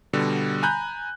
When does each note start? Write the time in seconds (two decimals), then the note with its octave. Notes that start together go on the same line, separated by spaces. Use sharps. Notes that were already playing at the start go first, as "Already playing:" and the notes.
0.13 B2 D3 G3
0.63 G#5 A#5 B5 F#6 G6